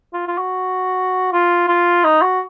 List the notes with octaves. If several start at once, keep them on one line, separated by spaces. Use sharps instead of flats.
F4
F4
F#4
F4
F4
D#4
F#4